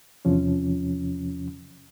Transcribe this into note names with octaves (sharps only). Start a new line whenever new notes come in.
E2 C3 F3 C#4